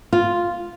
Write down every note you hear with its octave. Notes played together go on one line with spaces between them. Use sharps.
F4